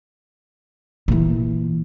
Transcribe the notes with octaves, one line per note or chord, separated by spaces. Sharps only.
A#2 E3